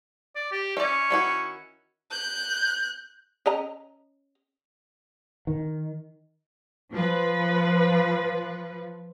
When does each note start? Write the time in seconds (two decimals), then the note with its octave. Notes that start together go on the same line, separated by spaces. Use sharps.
0.36 D5
0.52 G4
0.77 C#4 D5 E5
1.10 D#3 E4 F#4
2.11 F#6 G6
3.46 C#4 D#5 A#5
5.47 D#3
6.91 F3 B4